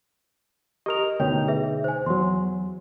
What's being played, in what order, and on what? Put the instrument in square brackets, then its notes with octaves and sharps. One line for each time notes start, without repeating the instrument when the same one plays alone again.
[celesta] G4 D#6 F7 [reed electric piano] A#4 D#5
[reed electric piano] D2 B2 D#4 [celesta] C#5 G5
[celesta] G#4 B4 E5
C5 G#5
[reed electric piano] E2 F#3 [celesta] C6